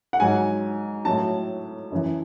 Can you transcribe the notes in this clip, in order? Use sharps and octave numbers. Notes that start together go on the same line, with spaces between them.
F#5
G#2 F#3 G#5
A2 F#3 A5
F#2 E3